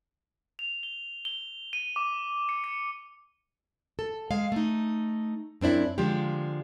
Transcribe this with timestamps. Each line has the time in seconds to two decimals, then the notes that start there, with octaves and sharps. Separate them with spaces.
0.59 F7
0.83 G7
1.25 G7
1.73 D#7
1.96 D6
2.49 C#7
2.64 C#7
3.99 A4
4.31 G#3 F5
4.52 A3 D#4
5.61 F#2 C4 D4 E4
5.98 D3 F3 G#3 F4 G4